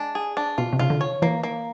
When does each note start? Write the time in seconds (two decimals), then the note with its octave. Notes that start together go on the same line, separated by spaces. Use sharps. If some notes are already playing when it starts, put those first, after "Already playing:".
Already playing: G#3 D4
0.15 G#4
0.37 D4
0.58 B2 F4
0.73 C3
0.79 C#3 F4
0.90 D3
1.01 C#5
1.22 E3 A#3
1.43 A#3